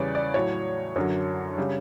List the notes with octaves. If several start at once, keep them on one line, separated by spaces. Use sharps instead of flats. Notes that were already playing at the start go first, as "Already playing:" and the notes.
Already playing: E2 C#3 G3 B4 C#5 D5
D5
A2 F#3 C#5
F#2 D3 F#3 C#5
C#3 G3